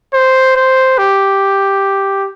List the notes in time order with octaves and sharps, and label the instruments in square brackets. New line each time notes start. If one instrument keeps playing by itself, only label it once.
[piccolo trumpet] C5
C5
G4